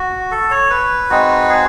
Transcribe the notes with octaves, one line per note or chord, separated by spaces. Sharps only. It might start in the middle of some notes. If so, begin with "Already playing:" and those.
Already playing: F#4
A4
C#5
B4
G#3 C4 D#4 F#4
G#4